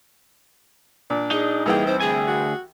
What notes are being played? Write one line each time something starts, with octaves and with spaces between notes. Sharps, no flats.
A#2 D4
D#4 G#4
C2 E3 A#3 G#4 G5
C4 C5
D2 G#4 G#5
F#4